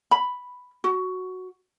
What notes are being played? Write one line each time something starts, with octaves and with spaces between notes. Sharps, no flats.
B5
F#4